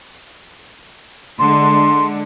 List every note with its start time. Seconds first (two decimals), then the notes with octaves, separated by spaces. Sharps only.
1.39 D3 G#3 C6